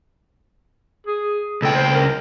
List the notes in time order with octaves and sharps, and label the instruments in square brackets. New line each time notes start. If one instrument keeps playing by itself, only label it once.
[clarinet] G#4
[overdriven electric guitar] C#2 G5 [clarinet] A4
[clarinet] C5
A#4